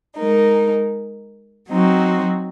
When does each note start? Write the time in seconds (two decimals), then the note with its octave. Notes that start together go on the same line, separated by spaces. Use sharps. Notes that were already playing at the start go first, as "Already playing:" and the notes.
0.17 G#3 D#4 A#4
1.69 F#3 C4 D#4 F#4